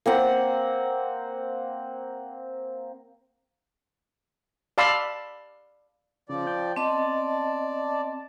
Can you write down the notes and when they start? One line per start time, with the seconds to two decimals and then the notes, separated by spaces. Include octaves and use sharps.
0.06 A#3 C4 F#5
4.78 D5 F5 A5 B5 C6 E6
6.29 C#3 F3 D5
6.47 G5
6.76 C4 D5 D#5 A5